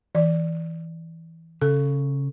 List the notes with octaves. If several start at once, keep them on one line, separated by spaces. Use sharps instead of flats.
E3 D5
C#3 A4